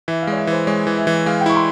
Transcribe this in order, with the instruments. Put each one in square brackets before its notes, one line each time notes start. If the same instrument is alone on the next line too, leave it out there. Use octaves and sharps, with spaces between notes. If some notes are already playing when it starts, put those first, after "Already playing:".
[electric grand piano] E3 [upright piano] E5
[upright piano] F5
[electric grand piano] G#3 [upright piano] C#5
[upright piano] E5
[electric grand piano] E3 [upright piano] C5
[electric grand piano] G#3 [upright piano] C#5
[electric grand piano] E3
[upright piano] E5
[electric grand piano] E3
[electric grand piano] G#3 [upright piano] F5
[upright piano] G5
[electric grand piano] E4 [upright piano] C#6
[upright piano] C6